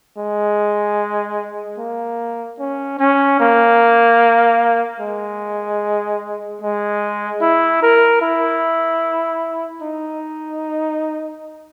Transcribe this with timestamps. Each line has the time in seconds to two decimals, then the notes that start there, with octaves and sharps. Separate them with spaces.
0.18 G#3
1.78 A#3
2.59 C#4
2.99 C#4
3.40 A#3
5.00 G#3
6.62 G#3
7.41 E4
7.82 A#4
8.22 E4
9.82 D#4